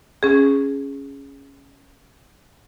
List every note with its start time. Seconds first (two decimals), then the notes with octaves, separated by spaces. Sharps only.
0.23 C#4 G#4